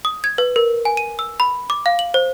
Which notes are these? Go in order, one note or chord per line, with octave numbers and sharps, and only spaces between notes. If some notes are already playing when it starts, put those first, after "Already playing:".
D#6
G#6
B4
A#4
G#5
D#7
E6
B5
D6
F5
F#7
C5